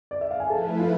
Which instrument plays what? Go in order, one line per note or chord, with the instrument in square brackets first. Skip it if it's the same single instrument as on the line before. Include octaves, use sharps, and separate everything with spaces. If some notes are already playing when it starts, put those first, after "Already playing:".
[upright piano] D5
E5
F5
G#5
[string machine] F3 A3 E4 B4 [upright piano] A4 A5
[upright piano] F4 F5